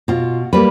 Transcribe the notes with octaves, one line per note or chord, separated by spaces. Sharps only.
B2 F4
G3 A#3 B4